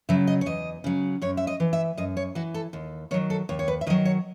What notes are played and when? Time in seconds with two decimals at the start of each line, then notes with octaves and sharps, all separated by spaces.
0.09 C#3 F#3 E5
0.27 D#5
0.41 C#5
0.46 E2 D#5
0.84 C#3 F#3
1.22 F#2 C#5
1.37 E5
1.47 D#5
1.60 E3
1.73 E5
1.97 F#2 D#5
2.17 C#5
2.35 E3 F#4
2.54 A4
2.73 D#2
3.11 D#3 C#5
3.14 F#3
3.30 A4
3.49 D#2 C#5
3.59 C#5
3.68 B4
3.81 E5
3.87 D#3 D#5
3.90 F#3
4.05 C#5